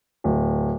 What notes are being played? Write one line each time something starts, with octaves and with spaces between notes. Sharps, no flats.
D1